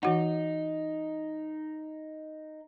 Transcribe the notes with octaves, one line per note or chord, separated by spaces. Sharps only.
E3 D#4 F#4 F#5